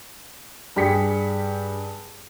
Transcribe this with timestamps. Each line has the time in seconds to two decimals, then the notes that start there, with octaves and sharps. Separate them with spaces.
0.76 G2 G3 G4 G#4 B6 C#7